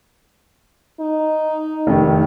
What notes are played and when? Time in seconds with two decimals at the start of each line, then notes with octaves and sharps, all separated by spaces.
1.00 D#4
1.87 F1 D#3